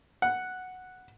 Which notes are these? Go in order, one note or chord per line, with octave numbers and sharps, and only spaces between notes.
F#5